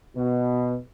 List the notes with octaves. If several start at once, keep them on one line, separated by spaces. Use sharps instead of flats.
B2